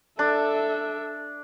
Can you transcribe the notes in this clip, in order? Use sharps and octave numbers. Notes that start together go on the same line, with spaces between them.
D4 A4 E5